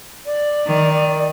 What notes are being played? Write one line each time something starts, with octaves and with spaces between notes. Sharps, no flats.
D5
D#3